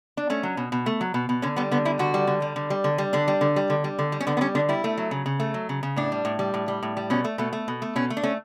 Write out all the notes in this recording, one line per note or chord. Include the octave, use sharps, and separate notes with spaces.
D4
A3 C#4
F#3
B2
B2
A3
F#3
B2
B2
D3 C#4
G3 B3
D3 B3
G3 E4
D3 F#4
G3
D3
G3
D3
G3
D3
G3
D3 D4
G3
D3
G3
D3
G3
D3
G3
C#4
D3 B3
B3
G3 C#4
D3 D4
G3 E4
A3
F#3
C#3
C#3
A3
F#3
C#3
C#3
A2 D4
G3
A2
G3
A2
G3
A2
G3
B2 C#4
A3
B2 A3
A3
B2
A3
B2 C#4
A3
D4
A3 C#4